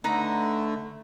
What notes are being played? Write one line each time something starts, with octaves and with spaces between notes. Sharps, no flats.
D3 A3 D#4 B4 A#5